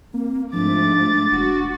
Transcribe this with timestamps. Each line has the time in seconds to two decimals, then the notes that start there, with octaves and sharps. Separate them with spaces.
0.14 A#3 C4
0.53 G#2 F3 A3 D4 D6 A6
1.32 E1 F#4